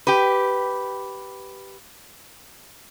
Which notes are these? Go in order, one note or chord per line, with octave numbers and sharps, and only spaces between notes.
G4 B4